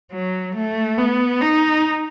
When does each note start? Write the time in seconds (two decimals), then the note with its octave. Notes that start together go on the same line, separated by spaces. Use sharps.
0.12 F#3
0.56 A3
0.98 B3
1.41 D#4